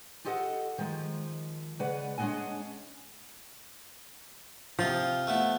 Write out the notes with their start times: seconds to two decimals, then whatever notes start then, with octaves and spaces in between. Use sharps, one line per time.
0.25 F4 G4 A4 D#5 F#5
0.78 D#3 F3 G#3
1.79 C#3 G#3 B4 D5 F#5
2.18 G#3 C#4 D4 D#5 F#5 G#5
4.79 C3 F3 F4 D#6
5.27 A3 B3 E4